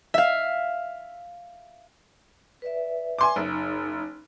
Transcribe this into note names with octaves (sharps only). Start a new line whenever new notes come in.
E5 F5
B4 D5 E5
G#5 C6 D6
F#1 D#4